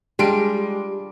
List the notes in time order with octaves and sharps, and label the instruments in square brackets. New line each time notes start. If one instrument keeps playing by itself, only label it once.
[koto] G3 D4 F4 [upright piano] G#3 D7 [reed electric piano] G4